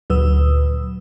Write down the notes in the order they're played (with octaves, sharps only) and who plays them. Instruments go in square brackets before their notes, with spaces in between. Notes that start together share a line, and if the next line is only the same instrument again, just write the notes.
[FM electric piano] D2 A#2 F#3 B4 D#6 E6